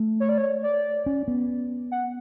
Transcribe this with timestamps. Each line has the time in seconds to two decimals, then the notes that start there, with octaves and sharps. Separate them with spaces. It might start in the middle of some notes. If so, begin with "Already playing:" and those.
Already playing: A3
0.20 C#5
0.29 D5
0.38 C#5
0.63 D5
1.06 C#4
1.28 B3
1.92 F#5